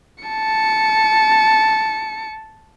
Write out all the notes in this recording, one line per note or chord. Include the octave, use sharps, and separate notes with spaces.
A5 C#7